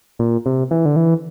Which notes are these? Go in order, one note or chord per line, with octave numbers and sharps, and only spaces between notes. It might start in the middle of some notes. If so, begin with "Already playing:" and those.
A#2
C3
E3
D3
E3